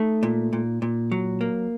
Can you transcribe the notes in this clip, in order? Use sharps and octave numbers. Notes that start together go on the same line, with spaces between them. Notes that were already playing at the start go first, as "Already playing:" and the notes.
Already playing: A3 D#4
A#2
A#2
A#2
F#3
A#3